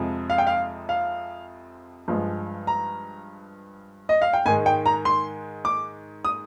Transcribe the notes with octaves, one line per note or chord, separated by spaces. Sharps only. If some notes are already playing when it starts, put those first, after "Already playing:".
Already playing: F2 C3 F3 G#3
F5
G5
F5
F5
G2 F3 G#3
A#5
D#5
F5
G5
G#2 D#3 G#3 G#5
G5
A#5
C6
D6
D#6